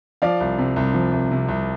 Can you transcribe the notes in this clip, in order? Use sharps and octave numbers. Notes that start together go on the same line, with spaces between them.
F3 D5 F5
C2
C3
C2
F3
C2
C3
C2